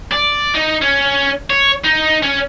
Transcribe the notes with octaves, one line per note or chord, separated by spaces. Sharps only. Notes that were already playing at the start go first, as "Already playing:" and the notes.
D5
D#4
C#4
C#5
D#4
C#4